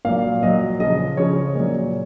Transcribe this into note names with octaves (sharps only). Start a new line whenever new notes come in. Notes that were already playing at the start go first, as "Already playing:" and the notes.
A#2 F#3 F5
A#2 F#3 D#5
C#3 F3 D#5
C#3 F3 C#5
A#2 F#3